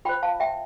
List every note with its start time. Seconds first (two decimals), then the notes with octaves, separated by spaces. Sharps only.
0.05 F4 G5 B5
0.09 C5
0.23 F5 A5
0.40 E5 G5